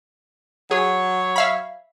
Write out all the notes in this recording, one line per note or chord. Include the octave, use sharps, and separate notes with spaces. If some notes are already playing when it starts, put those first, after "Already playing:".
F#3 G#4 C#5
E5 F5 B5